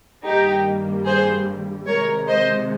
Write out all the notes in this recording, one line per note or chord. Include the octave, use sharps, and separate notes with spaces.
G2 D#3 G3 A#3 D#4 G4
G#4 C5
C3 D#3 G#3 A#4 C#5
C5 D#5